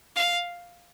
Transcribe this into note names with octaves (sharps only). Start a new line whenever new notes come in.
F5